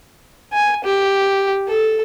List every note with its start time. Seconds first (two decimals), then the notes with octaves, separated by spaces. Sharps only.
0.53 G#5
0.84 G4
1.68 A4